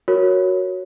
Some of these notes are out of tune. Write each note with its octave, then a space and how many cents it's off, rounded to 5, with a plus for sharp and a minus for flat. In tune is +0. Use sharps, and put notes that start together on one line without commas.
F#4 +0 A#4 +0 C#5 +0